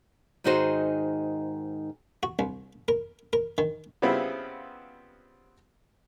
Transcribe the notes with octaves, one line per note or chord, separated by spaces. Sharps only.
G#2 D#3 D#4 F#4 G#4 C5
F#4
C2
A#4
A#4
D#3
C#3 G3 B3 C4 E4 F4